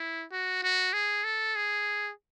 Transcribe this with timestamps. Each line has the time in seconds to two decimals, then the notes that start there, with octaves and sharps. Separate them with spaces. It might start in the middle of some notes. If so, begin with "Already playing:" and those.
Already playing: E4
0.32 F#4
0.63 F#4
0.93 G#4
1.24 A4
1.56 G#4